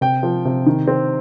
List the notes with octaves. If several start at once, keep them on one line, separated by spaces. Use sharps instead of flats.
C3 G5
F3
C3
D#3
C4